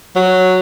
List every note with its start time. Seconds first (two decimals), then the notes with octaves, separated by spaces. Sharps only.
0.16 F#3